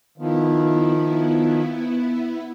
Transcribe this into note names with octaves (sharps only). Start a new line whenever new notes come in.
D#3 F3 B3 E4